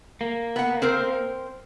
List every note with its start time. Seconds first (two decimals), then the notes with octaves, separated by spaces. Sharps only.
0.21 A#3
0.56 B3 F#5
0.82 C4 A#4 C5